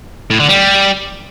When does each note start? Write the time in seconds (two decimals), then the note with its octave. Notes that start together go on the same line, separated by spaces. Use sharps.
0.30 A2
0.40 D3
0.49 G3